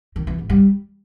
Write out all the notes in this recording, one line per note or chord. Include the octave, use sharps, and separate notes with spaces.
D#3
E3
G#2
G3